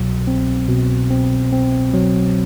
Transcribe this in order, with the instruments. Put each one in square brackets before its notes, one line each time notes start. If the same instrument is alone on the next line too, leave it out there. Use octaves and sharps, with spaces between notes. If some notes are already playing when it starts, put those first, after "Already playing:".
Already playing: [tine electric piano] C2 B2 F#3
C4
B2
C4
C4
F#3